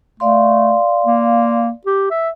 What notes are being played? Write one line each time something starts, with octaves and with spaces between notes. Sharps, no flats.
A3 D5 F5 C6
A#3
G4
E5